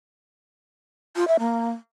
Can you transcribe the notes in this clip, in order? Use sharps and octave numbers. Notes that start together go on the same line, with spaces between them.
F4
E5
A#3